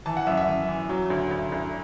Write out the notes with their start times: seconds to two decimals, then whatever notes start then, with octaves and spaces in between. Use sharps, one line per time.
0.06 E3 A5
0.17 F#5
0.27 F#2 E5
0.37 E5
0.47 F#2
0.69 E3
0.89 F#3
1.10 D2
1.31 D2
1.52 D2